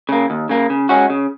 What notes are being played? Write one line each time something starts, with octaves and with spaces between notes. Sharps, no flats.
C#3 A#3
D#2
C#3 A#3
C#3
G#3 C#4 F#4
C#3